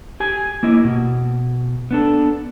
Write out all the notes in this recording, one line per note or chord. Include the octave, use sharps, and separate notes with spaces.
G4 G#5
A#3 E4 D#5
B2
B3 D4 A4